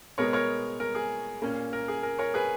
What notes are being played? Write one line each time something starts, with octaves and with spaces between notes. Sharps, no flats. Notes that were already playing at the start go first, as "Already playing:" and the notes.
B2 G#3 B3 A#4 C#5
A#4 C#5
A#4
G#4
A#2 A#3 C#4
A#4
G#4
A#4
A#4 C#5
G#4 B4